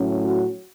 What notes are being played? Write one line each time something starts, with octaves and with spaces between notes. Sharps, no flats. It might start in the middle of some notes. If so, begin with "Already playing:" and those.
Already playing: A2 F#3 C#4
F#4